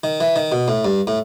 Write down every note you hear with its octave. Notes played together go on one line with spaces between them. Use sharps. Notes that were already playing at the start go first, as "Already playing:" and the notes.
D#3
E3
D#3
B2
A2
G2
A2